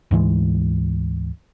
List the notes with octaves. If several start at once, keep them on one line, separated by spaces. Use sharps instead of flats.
D2 G#2 E3 G#3